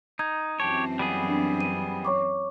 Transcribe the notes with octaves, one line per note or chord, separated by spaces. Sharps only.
D#4 G#6
F#2 E3 C4 G4 C#5 A5
G3 B3 G#4
D4
D#7
C#5 C#6 D6